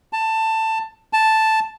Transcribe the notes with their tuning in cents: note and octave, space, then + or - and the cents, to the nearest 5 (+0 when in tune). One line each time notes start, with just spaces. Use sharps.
A5 +15
A5 +0